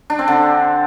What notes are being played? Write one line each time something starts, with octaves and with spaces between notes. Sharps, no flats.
D4
C4
D3